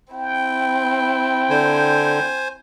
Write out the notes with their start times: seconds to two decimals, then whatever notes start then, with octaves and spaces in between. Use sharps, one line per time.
0.13 C4 E4 G5
1.50 D3 C5 G#5